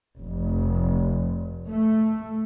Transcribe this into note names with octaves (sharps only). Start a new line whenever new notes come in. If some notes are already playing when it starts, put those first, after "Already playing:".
F1
A3